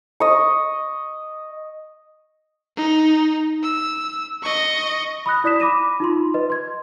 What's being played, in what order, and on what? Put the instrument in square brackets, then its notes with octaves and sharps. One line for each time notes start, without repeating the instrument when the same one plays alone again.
[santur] D#5 C#6
[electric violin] D#4
E6
D#5 C#6
[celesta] B5 D#6 F#6 A#6
E4 D5 D#6 B6 E7
B5 D6 A#6 D#7 E7
D#4 F4 C6
B4 D#5
C6 G#6